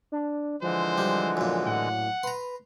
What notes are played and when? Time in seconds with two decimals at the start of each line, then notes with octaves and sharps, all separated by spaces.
0.12 D4
0.62 D3 E3 F3 G#3 C5
0.98 G3
1.37 F#2 A#2
1.66 A2 F#5
2.23 B4 A#5 C6